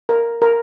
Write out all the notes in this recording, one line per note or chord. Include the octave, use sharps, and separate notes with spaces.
A#4
A#4